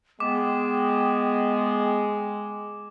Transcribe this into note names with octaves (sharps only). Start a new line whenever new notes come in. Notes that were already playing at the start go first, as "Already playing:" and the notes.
G#3 B3 G5 D6